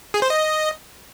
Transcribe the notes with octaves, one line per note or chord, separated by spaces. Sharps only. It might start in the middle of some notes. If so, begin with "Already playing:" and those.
G#4
C5
D#5